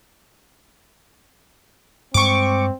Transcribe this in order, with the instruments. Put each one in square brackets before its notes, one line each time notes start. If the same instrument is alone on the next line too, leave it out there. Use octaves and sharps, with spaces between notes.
[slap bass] G2 G#3 [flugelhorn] C4 [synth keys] C#6 D6